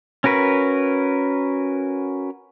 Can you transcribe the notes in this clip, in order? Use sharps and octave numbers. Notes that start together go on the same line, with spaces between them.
C#4 F#4 A#4 B4